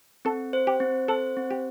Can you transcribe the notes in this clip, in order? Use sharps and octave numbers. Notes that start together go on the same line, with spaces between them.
C4 A4
C5
G4
C4
A4 C5
C4
G4